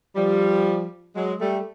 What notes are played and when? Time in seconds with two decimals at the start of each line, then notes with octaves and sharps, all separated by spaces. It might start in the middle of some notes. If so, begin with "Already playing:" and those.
0.16 F3 G3
1.15 F#3 G#3
1.40 G3 A3